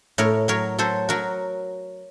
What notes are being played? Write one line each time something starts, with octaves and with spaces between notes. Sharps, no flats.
A2 A#4 C#5
F#3 A#4 C#5
F#3 A4 C5
F#3 F#4 A#4